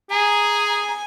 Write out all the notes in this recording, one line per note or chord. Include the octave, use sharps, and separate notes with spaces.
G#4 G#5 A#5